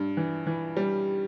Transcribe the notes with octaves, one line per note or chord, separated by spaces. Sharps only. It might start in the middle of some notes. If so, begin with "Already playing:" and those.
Already playing: G2
E3
E3
G3